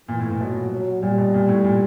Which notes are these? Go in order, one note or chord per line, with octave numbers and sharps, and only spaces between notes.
A#2 E3
A2
A#2
B2 F#3
F#3
A#2 G3
B2
A#2
A2
A#2